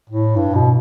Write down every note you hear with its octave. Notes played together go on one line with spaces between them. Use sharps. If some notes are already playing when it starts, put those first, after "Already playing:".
A2
G2
B2